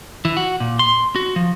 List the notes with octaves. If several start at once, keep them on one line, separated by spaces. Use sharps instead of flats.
E3
F#4
A#2
C6
F#4
F3